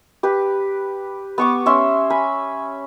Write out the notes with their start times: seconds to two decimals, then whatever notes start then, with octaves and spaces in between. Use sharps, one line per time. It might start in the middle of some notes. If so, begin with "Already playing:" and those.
0.23 G4 B4
1.38 B3 C#6 D6
1.66 C#4 E5 C6
2.10 G#5 B5